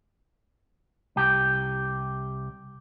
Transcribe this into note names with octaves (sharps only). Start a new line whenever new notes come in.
C2 G4